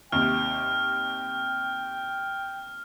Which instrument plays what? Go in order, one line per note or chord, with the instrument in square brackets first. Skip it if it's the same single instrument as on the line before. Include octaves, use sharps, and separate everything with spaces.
[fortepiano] D#2 C3 [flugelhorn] G5 [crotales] F6